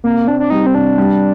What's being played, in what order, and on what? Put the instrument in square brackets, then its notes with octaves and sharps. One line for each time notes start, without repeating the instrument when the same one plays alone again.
[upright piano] C3 [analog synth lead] A#3
[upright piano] C4 [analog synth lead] D4
[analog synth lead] D4
[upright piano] G3 [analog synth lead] D#4
[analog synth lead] C4
[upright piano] C3 [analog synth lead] D4
[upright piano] G3